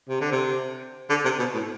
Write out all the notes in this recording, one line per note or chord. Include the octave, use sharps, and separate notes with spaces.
C3
D3
C3
D3
C3
B2
A2